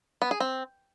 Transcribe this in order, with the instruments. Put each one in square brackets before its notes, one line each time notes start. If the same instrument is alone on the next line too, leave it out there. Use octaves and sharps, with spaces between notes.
[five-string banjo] B3
G#4
C4